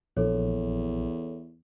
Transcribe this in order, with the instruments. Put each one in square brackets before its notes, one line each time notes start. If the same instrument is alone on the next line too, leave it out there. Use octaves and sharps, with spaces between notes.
[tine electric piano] A#1 [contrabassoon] E2 [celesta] A4 C#5